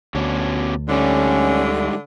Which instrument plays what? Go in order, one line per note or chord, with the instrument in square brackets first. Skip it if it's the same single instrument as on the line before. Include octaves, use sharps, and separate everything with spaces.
[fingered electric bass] D2 [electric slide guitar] B2 C#4 D4
[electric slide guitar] G#2 G3 A3 [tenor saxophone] D3 [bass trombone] C#4